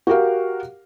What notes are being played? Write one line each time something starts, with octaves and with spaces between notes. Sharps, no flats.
F#4 G4 A#4 F5